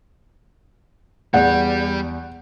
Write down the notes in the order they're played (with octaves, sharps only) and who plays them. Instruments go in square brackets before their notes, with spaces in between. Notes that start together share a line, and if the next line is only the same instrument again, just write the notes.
[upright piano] E2 D5 [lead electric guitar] G3 [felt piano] F#5